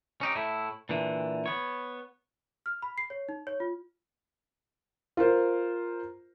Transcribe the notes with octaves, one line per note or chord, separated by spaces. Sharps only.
C#4 D#4 G4
A2 A3 E4
A#2 D3 E3
B3 C#5
F6
B5
C7
C#5
D#4
C#5
F4
F4 A#4 C5